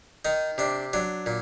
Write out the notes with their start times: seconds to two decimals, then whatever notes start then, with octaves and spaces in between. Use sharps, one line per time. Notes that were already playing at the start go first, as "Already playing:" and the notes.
0.25 D#3 D#4
0.58 C3 D4
0.93 F#3 D4
1.26 A#2